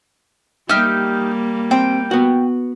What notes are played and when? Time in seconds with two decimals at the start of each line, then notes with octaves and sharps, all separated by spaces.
0.69 G3 A#3 D#4 G4 E5 F6
1.71 C4 G5
2.11 B3 F#4